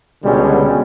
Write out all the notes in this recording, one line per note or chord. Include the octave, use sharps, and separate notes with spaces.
C#2 B2 D3 G3 G#3 C#4